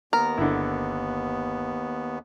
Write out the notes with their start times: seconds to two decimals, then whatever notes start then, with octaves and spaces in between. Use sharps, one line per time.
0.13 D#2 B3 A#4
0.38 G1 D3 E4